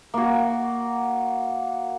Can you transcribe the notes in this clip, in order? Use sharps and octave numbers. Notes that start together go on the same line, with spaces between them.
A#3 F#4